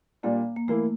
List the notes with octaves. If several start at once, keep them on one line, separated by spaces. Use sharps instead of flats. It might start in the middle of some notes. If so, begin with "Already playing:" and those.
A#2 G3 A#3 D4
A#3
E3 A3 A#3 E4